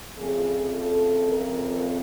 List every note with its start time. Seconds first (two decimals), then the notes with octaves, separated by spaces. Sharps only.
0.17 F2 C#3 F3 A3 C4 G#4
0.73 A4
1.29 A#4